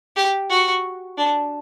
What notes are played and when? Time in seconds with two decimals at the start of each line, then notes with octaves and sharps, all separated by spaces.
0.16 G4
0.50 F#4
1.17 D4